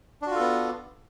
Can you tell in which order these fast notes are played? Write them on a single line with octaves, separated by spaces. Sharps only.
D4 F#4 F4 A4 B3